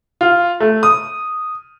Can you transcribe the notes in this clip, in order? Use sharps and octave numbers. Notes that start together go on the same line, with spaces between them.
F4
A3
D#6